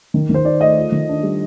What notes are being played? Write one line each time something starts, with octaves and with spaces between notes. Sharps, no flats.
D#3
D#3 C5
D#4 D5
A3 D#5
F4
D#3
D4
G3